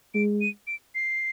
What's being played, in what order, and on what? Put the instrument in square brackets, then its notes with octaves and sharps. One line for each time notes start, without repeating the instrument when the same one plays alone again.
[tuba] G#3 [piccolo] D7
[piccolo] D#7
D7
C7